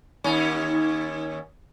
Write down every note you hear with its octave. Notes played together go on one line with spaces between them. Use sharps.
D#2 C#4